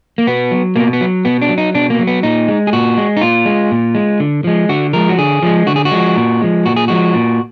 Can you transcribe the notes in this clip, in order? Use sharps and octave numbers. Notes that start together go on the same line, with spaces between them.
A#3
B2 B3
F#3
B2 A#3
B3
F#3
B2 B3
D4
F#3
D#4
B2 D4
A#3
F#3
B3
A#2 D#4
G#3
G#4
A#2 F#4
G#3
D#4
A#2 F4
G#3
A#2
G#3
D3
F3 G#3
D3 F#4
F3 G#3 A#4
F#4
D3 G#4
F3 G#3
D3 F#4
G#4
F#4
F3 G#3
A#2
F3 G#3
A#2 F#4
G#4
F3 G#3 F#4
A#2